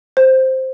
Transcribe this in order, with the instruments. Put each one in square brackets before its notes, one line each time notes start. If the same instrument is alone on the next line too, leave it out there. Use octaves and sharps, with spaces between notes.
[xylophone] C5